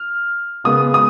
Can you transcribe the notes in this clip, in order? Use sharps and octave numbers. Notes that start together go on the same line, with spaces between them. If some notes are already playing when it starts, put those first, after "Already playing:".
Already playing: F6
C#3 G#3 B3 D#6
D#6